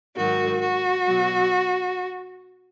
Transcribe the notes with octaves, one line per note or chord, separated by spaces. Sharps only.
G#2 D#3 F#3 F#4
F#4
B2 F#3